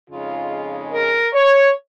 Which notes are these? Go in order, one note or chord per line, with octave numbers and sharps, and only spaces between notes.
F2 C#3 G#3 D#4 F4
A#4
C#5